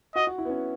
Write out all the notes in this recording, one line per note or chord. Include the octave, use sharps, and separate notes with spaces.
F#4 D#5
F#4
E4
B3
C#4